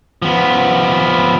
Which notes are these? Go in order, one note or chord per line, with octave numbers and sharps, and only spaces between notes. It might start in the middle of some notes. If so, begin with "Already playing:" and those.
F3 B3